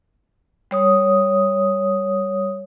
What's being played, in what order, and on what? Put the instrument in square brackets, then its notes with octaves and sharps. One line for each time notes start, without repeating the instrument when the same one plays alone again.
[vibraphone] G3 C#5 D#6